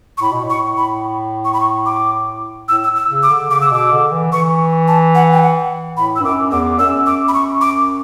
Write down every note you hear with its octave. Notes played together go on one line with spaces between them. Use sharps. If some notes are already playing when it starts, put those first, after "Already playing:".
C#6
A2 B5
B2
A2
C#6
B5
C#6
B5
C#6
D6
A2 E6
E6
E6
C#3
D6
D3
C#3 D6
E6
B2 D6
D3
E3
E3 C#6
A5
F#5
G5
F#5
A2 B5
E6
G2
F#2 D6
E2 D6
F#2 E6
D6
B5
C#6
D6